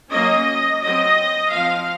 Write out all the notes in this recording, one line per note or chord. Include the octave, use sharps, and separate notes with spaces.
F#3 A#3 C#4 D#5
F#3 C4 D#5
F3 C4 F5